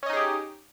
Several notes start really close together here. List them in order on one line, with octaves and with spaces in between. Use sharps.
C#4 D#5 D#4 G#4 G4